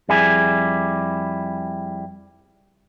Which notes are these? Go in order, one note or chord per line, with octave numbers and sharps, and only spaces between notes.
F2 G3 E4 G#4 G#5